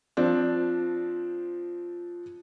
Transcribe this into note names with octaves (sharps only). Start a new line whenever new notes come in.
F3 C4 D4